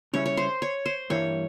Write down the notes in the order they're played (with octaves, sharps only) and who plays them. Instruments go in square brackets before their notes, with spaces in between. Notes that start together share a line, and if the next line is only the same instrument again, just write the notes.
[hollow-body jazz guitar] C#3 G3 C#4 E4 [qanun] C#5
[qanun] C#5
C5
C#5
C5
[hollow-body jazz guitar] G2 E3 G3 A#3 E4 [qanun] C#5